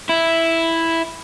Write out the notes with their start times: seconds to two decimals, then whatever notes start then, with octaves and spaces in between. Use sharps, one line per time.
0.09 E4